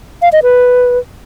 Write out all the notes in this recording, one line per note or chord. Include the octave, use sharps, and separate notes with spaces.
F5
D#5
B4